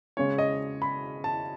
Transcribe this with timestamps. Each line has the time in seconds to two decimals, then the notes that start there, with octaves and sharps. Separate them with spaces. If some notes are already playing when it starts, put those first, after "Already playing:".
0.17 C#3 G#3 C#4 C#5
0.38 D#5
0.82 B5
1.24 A5